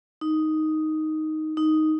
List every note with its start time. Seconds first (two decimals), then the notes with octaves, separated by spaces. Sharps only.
0.21 D#4
1.57 D#4